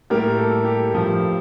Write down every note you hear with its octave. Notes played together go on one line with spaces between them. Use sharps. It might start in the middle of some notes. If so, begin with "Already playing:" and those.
A2 G3 A#3 G4 A#4
A4
G4
G2 F3 A3